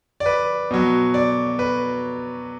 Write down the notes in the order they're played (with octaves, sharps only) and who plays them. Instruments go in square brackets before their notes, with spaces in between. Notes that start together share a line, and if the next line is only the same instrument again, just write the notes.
[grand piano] D5
B4
B2 F#3
D5
B4